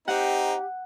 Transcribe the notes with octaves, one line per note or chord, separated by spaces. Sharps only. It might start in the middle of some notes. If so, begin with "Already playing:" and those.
C4 D#4 G4 F#5